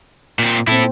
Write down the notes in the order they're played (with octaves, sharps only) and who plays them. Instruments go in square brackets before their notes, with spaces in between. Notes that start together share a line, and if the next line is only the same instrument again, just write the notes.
[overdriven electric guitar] A#2 C4
[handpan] A#2 C4 [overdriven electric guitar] E4 A4